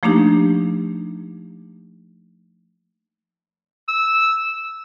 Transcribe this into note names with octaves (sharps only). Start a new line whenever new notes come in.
F3 A3 A#3 D4 D#4 G4
E6